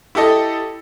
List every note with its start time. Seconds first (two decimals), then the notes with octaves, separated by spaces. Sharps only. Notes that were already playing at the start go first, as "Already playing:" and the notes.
0.15 E4 G4 A4 D#5